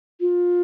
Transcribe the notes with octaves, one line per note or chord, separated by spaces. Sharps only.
F4